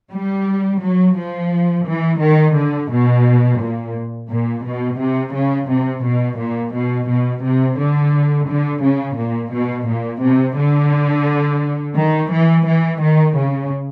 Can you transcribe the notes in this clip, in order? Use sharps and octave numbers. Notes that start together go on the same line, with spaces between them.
G3
F#3
F3
E3
D#3
D3
B2
A#2
A#2
B2
C3
C#3
C3
B2
A#2
B2
B2
C3
D3
D3
C#3
A#2
B2
A#2
C3
D3
D#3
E3
E3
D#3
C#3